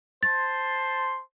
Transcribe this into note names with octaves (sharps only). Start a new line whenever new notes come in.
C5 A5 C6 A6